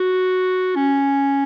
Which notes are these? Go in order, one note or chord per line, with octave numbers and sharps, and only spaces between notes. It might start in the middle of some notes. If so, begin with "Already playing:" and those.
Already playing: F#4
C#4